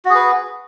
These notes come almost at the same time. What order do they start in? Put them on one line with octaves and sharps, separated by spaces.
F#4 G#4 B4